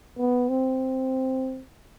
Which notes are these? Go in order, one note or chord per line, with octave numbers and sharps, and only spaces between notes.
B3
C4